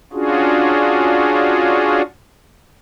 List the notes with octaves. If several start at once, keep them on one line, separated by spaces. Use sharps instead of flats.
C#4 D4 F4 F#4 G#4